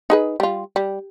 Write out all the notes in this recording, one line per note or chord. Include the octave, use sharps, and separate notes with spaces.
D#4 G#4 B4
G3 F4
G3